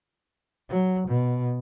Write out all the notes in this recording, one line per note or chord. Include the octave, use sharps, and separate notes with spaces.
F#3
B2